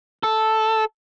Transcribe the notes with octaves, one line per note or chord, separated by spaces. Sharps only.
A4